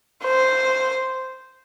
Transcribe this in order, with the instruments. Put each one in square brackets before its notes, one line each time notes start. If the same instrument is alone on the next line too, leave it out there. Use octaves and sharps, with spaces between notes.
[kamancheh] C5